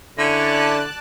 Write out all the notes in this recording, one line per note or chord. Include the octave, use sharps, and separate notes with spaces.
D3 C#4 E4 D5 A5 F#6